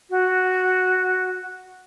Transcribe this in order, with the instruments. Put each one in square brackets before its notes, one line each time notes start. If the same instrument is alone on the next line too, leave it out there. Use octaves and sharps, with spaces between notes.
[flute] F#4